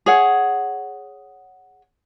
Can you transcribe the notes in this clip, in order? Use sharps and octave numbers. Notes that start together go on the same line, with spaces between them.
G#4 C#5 F#5